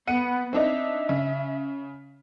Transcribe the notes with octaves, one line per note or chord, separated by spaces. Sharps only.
B3 F#5 C#7 D#7
C4 D4 D#4 E5
C#3